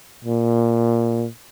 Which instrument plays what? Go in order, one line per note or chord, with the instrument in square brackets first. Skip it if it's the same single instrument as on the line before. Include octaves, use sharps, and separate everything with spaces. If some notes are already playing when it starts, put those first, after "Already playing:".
[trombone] A#2